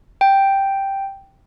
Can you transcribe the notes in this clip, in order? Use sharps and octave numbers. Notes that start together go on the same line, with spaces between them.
G5